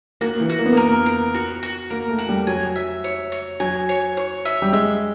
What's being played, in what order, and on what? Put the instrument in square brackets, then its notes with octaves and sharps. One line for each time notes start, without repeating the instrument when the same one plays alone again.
[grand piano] A#3 [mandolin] F#4
[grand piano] E3
[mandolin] F#4
[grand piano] A#3
B3
[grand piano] A#3 [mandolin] A#4
[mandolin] A#4
F#4
F#4
[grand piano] A#3 [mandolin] A#4
[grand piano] A3
[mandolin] F#4
[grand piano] G3
[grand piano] F#3 [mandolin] G#5
[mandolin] E5
C#5
C#5
[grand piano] F#3 [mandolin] G#5
[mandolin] C#5
C#5
E5
[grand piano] G3
[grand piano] G#3 [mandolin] E5